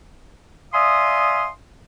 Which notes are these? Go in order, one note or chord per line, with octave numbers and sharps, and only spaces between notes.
D5 E5 F5 G#5 C6 D#6